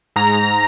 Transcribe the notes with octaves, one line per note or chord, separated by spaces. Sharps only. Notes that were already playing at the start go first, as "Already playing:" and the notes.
G#2 A#5
G#2